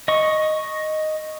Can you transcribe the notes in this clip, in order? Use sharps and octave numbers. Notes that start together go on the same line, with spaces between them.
D#5 C#6